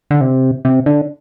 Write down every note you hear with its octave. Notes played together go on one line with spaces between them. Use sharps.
D3
C3
C3
D3